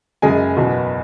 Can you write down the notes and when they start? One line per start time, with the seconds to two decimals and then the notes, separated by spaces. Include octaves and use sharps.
0.22 F#1 F#2 C#3 G#3 G#5
0.56 F#1 E2 B2